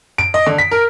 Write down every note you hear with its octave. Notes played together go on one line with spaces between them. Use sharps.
D7
D#5
D3
B6
A#4